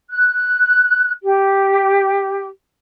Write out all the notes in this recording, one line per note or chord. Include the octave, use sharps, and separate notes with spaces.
F#6
G4